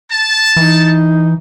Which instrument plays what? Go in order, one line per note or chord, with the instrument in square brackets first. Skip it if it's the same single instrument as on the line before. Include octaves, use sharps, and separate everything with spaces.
[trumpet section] A5
[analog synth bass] E3 [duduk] D#4